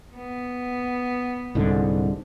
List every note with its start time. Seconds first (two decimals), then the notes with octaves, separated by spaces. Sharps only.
0.15 B3
1.55 C2 G#2 D3